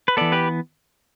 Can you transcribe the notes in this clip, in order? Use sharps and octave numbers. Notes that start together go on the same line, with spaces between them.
B4
E3 B3 A4 D5
G4 B4